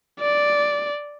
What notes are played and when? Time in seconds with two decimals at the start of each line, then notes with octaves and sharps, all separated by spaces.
0.20 D5